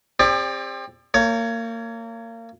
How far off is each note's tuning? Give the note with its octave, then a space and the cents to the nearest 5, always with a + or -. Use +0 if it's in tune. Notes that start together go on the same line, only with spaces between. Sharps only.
C4 +25 G4 +40 D5 +0
A#3 -30 C#5 +15